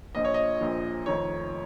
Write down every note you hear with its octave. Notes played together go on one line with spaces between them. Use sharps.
A#1 A#2 F3 D#5
C#5
D#5
A#1 A#2 F3
F1 F2 D#3 C#5